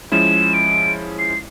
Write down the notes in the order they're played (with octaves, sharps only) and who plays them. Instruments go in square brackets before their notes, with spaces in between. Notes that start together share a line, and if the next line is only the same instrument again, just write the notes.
[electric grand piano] F3 G#3 C#4 E4 [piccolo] E7
[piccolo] D7
C7